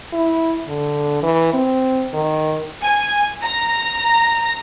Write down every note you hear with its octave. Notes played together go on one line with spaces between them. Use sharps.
E4
D3
E3
C4
D#3
G#5
A#5